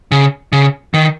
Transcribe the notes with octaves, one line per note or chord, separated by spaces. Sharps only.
C#3
C#3
D#3